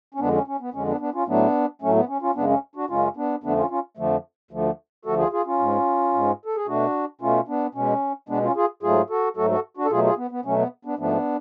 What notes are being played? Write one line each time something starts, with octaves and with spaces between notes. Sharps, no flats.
C#4
F2 D3 G#3 B3 D4
C#4
C#4
B3
F2 D3 G#3 C#4
B3 D4
B3 D4
C#4 F4
A2 F#3 A3 B3 D4
A2 F#3 A3 C#4
B3
C#4
C#4 F4
F#2 C#3 G#3 B3 D4
C#4
D4 F#4
F#2 C#3 G#3 C#4 F4
B3 D4
F2 D3 F3 A3 B3 D4
C#4 F4
C#4 F4
F2 D3 F3 A3
D2 D3 F3 A3
D2 D3 F3 A3 F#4 A4
F4 G#4
F4 G#4
C#4 F4
G#2 G#3
G#2 G#3
A4
G#4
B2 A3 D4 F#4
B2 A3 C#4 F4
B3 D4
B2 G#3 C#4
B2 G#3 B3 D4
C#4 F4
F4 G#4
G#2 F#3 A3 F4 G#4
F#4 A4
G#2 F#3 A3 F#4 A4
F#4 A4
D4 F#4
A4
B2 F#3 A3 F4 G#4
F4 G#4
B3
B3
B2 F#3 A3 C#4
B3
B3 D4
G#2 F3 A3 B3 D4